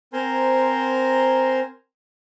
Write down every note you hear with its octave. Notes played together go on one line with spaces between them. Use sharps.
C4 A#4 C5 G#5 A#5 C6